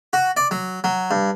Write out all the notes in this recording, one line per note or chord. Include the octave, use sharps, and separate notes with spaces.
F#4
D5
F#3
F#3
G2